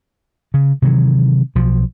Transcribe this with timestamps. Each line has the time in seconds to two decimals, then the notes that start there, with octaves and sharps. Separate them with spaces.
0.54 C#3
0.82 C3 D#3 E3 F#3
1.55 B1 F3